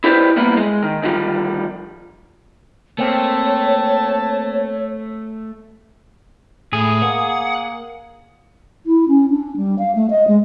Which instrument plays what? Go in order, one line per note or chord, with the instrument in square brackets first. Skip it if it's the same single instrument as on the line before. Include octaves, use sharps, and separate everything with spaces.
[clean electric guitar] E4 G4 B4 C5 D5
G3 A#3 B3 E4
G#3
D#3
D2 D#3 F3 G3
[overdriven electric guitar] A3 [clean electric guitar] A#3 C4 [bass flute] C#5 [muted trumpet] A5
[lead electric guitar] A2 [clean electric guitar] G#4
[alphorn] A#3 [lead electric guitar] F#5
[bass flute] E4
C#4
D4
G3
F5
A3
D#5
G#3